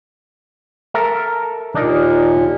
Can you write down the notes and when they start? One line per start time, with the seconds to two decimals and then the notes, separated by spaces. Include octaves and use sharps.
0.94 A4 A#4 E5
1.75 D#2 A#2 D4 D#4 A#4